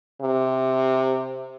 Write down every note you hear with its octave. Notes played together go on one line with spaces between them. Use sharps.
C3